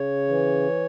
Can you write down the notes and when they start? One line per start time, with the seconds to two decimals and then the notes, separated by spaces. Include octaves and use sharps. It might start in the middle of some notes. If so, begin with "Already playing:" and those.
Already playing: C#3 C#5
0.28 E3